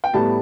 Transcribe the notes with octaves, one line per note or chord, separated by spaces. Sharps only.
G5
A2 G3 B3 A5